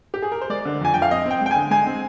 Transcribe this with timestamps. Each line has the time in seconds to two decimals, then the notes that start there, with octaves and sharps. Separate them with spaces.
0.14 G4
0.22 G#4
0.32 A#4
0.41 C5
0.50 G#3 D5
0.65 D3
0.81 F2 G#5
0.94 F2 G5
1.02 F5
1.11 C4 D#5
1.26 C4 G5
1.41 G#3
1.46 G5
1.51 G#5
1.56 D3
1.71 G#3 G#5
1.87 C4